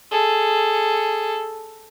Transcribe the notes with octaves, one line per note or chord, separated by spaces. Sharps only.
G#4 A4